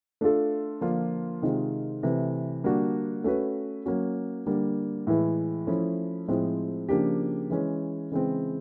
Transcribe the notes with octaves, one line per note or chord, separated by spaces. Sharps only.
A3 D4 F4 A4
D3 F3 A#3 D4 F4
C3 D#3 G#3 C4 F4
C3 E3 A3
D3 G3 A#3 D4 F#4
A3 C#4 F#4 B4
F#3 A#3 C#4 F#4
D3 G3 A#3
A2 E3 G#3
F3 A3 C#4 E4
A2 F3 G#3 C4
C#3 F3 A#3 D4 G4
E3 G#3 C#4
C#3 E3 G#3 C4